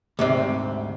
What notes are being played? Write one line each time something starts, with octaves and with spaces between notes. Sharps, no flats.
D2 G#2 C3